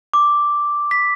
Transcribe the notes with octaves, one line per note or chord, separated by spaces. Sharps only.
D6
B6